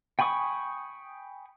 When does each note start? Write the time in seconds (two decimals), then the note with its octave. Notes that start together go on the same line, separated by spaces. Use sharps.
0.19 G5 G#5 B5 C#6 D#6